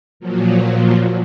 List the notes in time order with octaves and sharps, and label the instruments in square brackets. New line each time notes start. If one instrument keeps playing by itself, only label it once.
[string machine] A#2 F3 F#3